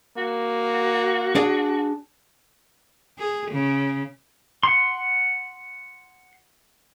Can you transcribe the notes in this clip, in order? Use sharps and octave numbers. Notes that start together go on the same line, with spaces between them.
A#3 F#4
D4 G#4
G#4
C#3
F#5 C6